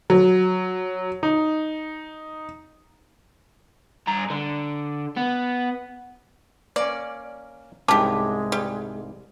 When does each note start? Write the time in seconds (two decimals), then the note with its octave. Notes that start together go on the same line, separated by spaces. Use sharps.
0.10 F#3
1.23 D#4
4.07 G2 A#5
4.30 D3
5.16 B3
6.76 A#3 C#4 D5
7.88 C2 G#2 G#3 C#4 G4 B4 A5 D6
8.52 G3